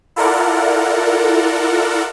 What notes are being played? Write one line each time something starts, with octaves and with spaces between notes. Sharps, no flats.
E4 F4 A4 A#4 D5 F#5